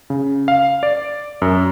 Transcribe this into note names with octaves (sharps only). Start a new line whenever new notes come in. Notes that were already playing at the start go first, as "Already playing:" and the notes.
C#3
F5
D5
F#2